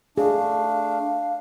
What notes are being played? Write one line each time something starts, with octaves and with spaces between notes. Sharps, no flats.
A3 D4 G#4 F5